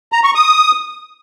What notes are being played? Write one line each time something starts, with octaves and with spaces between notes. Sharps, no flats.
A#5
C#6
D#6